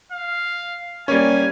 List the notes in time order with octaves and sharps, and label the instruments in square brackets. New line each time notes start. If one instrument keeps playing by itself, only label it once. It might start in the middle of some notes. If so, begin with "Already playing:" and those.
[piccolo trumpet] F5
[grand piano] G3 A#3 C#4 [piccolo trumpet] G#5